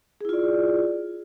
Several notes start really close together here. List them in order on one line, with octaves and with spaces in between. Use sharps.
G#4 E4 F4 D5